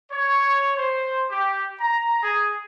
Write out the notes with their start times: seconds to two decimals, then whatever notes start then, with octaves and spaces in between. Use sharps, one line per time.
0.11 C#5
0.77 C5
1.30 G4
1.80 A#5
2.23 G#4